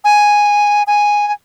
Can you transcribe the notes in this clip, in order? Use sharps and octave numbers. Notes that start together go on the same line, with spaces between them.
G#5
G#5
G#5